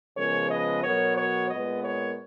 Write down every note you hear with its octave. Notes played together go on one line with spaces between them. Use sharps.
C#3 F3 G#3 B3 A#4 C#5
B4 D#5
B2 F#3 B3 A#4 C#5
A#4 C#5
A#2 G#3 B3 B4 D#5
A#4 C#5